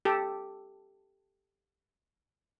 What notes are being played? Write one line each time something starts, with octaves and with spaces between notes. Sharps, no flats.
G4 A4